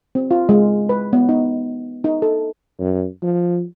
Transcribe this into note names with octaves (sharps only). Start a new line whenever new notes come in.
C4
F4
G#3
B4
B3
D#4
D#4
A4
F#2
F3